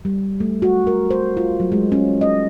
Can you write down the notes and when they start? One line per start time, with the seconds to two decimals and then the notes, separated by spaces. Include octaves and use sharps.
0.05 G3
0.40 A3
0.62 F#4
0.87 A#4
1.11 C5
1.37 F4
1.60 F#3
1.72 G#3
1.92 C#4
2.21 D#5